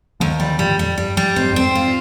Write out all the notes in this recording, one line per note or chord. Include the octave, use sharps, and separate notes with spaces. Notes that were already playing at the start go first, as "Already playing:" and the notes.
D#2 D3 F3
D3 F3 G3
G2 A#2 G3
F2 G3
G2 G3
G3
G#2 C4
G2
F2 G#2 C4
F4